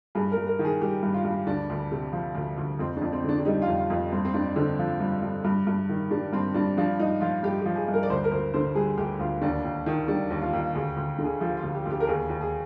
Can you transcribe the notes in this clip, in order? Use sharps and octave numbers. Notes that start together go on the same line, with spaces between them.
G2 G#4
A#4
G2
A#4
D#3
G#4
G3 G4
G2
F4
G2
D2 D4
D2
C3
F3
D2
D2
F2 C4
D4
F2
C4
D3 D4
D4
G3 D#4
F4
F2
F4
F2
G2 C4
C4
G2 D4
D3 C4
F3
G2
G2
G2
G2
D#3
G3 D4
G2 C4
G2 D4
F3 D4
G2 D#4
F3 F4
G2 G4
G4
F3
G#4
G2
A#4
D5
D2 C5
A#4
D2 C5
D3 C5
G3 G#4
D2 G4
D2 F4
D#2 D4
D#2
D#3
G3 D4
D#2
F4
D#2
D2 G#4
D2
D3
G#4
F3 G4
F4
D2
G4
D2 G4
A#4
D#2 G#4
D#2
G#4